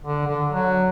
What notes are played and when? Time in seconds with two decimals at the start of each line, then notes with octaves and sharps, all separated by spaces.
0.04 D3
0.27 D3
0.51 F#3